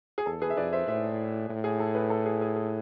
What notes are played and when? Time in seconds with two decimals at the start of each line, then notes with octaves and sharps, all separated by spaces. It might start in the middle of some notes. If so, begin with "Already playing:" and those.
0.18 G#4
0.26 E2 A4
0.42 G#4 B4
0.50 E5
0.57 F2 B4 D5
0.73 C5 E5
0.87 A2 C5 E5
1.49 A2
1.64 G#4
1.80 A4
1.95 G#4 B4
2.10 A4
2.26 G#4
2.41 G#4
2.56 G#4